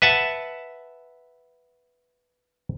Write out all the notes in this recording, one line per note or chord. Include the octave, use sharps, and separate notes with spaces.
B4 E5 F#5 A5